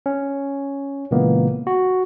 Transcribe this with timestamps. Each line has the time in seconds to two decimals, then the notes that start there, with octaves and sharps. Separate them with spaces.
0.06 C#4
1.11 A#2 C#3 E3 G#3 A#3 B3
1.67 F#4